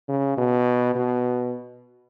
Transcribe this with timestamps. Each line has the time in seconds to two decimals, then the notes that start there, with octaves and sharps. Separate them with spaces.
0.09 C#3
0.38 B2
0.95 B2